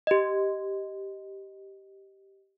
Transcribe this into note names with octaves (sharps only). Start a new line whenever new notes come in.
G4 D#5